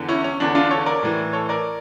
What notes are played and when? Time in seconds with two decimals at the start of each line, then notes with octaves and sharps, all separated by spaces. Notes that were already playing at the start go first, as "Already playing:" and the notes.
Already playing: E2 D3
0.09 C#4 E4
0.24 C#4
0.40 E2 D3 D4
0.55 D4 F4
0.70 A4 C#5
0.86 A#4 D5
1.03 A2 E3
1.33 A4 C#5
1.49 A#4 D5